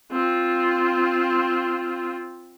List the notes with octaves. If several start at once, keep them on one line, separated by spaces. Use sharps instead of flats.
C4 F4